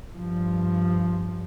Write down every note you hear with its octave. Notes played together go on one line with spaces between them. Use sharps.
G2 F3